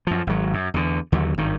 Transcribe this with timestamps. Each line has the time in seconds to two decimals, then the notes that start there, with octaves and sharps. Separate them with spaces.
0.07 F#2 F3
0.27 G#1 F#3
0.54 F#2
0.74 E2 D3
1.12 D#2 D3 F#3
1.38 G#1 G2 D#3